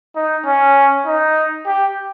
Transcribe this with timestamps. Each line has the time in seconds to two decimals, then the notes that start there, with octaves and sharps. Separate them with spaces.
0.16 D#4
0.46 C#4
1.06 D#4
1.66 G4